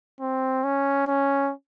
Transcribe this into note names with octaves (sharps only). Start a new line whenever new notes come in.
C4
C#4
C#4